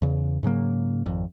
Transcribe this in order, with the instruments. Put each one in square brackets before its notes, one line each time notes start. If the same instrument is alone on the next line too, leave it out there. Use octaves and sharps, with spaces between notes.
[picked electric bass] E2 C#3
G#2 C#3 F#3 A#3
G#1 F2